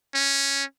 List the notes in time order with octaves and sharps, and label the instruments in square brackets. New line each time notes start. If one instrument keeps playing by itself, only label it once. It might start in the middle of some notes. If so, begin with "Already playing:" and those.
[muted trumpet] C#4